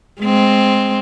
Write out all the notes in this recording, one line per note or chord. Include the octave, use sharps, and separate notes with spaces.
G#3 C4